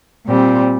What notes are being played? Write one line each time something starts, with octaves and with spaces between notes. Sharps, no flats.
A#2 G3 C4